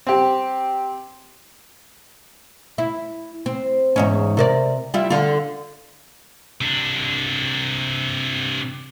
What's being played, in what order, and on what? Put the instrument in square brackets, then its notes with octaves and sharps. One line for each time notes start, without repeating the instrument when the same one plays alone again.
[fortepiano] C4 G4
[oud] E4
C4
E2 G#2 C#4
C3 A#4 D5
G3 E4 F4
D3 F4
[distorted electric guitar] C3 D4